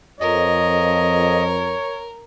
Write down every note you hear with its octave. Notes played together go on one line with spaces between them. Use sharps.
F2 A#4 C#5 D#5